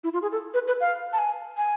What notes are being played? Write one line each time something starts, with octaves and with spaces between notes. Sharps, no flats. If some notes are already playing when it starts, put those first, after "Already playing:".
E4
F4
G#4
A4
B4
B4
F5
A5
G#5
G#5